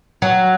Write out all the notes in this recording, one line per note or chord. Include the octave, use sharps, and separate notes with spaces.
F#3